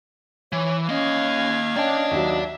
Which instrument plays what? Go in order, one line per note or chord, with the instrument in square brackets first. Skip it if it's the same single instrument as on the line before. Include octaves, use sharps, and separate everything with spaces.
[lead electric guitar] E3 [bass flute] C#5
[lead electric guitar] A#3 D#5 [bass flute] C#4 [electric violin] F5 G#6
[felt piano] C#4 G5 [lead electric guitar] D5 A5 [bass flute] D#5
[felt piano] D#2 F#3 [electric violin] E5